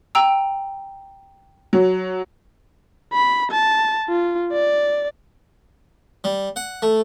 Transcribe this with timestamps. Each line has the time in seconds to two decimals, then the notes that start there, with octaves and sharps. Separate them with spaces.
0.15 G5 A#5 E6
1.73 F#3
3.13 B5
3.51 A5
4.09 F4
4.53 D5
6.24 G3
6.56 F#5
6.82 A3